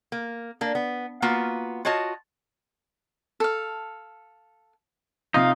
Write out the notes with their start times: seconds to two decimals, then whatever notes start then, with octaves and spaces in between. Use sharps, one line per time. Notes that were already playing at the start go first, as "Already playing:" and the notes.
0.12 A#3
0.61 A#3 D4
0.75 B3
1.22 A#3 B3 F4 F#4
1.85 F4 F#4 C#5 D#5 A5
3.40 A4 F5
5.34 C3 D#4 F4 F5